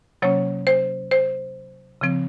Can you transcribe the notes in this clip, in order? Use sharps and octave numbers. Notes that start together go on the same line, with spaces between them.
C3 F#3 A#3 C#4 C#5
C5
C5
C#3 F3 C4